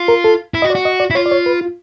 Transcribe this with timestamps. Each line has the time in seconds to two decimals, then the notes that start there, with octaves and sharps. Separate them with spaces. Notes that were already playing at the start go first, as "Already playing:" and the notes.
Already playing: F4
0.08 A#4
0.24 A4
0.54 E4
0.62 F#4 D#5
0.70 D5
0.75 F#4
0.85 D#5
1.00 D5
1.10 E4
1.15 F4 C#5
1.26 D5
1.31 C#5
1.46 B4
1.61 F4